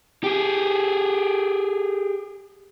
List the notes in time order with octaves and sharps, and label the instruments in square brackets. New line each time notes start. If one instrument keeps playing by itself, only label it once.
[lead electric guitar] G4 G#4